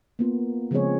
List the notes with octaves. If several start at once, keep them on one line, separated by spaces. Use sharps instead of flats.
A#3 B3 F4
C#3 F3 G#3 C4 G#4 C#5